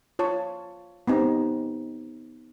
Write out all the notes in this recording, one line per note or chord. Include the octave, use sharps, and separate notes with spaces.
F4 C#5 A5
B3 C4 D#4 G4